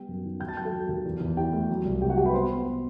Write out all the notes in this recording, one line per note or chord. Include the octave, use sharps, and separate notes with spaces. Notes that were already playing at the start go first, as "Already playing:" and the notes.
Already playing: G3 B3 G5
F#2
D#3
D#2 G5 G6
A5 A6
F#3 G5 G6
A4 A5
F#3
D#2
E2
E2
E4 G4 G5
A3
F#3
C2
C3 G4 G5
F#4 F#5
C3 G4 G5
B4 B5
B3 C5 C6
B3
B3